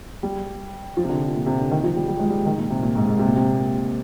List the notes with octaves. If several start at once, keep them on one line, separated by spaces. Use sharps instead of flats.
G3
F3
C3
D3
A#2
C3
D3
D#3
F3
G3
G3
G#3
G3
D#3
A#2
C3
A#2
G#2
G#2
C3
A#2
C3